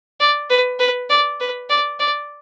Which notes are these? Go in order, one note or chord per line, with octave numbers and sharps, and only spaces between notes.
D5
B4
B4
D5
B4
D5
D5